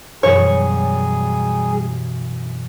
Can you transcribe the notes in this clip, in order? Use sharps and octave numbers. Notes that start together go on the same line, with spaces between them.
F#2 B2 E3 G3 G#4 C#5